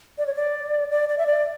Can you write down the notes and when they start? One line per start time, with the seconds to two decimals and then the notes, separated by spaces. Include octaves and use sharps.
0.18 D5
0.26 C#5
0.35 D5
0.91 D5
1.09 D5
1.18 E5
1.27 D5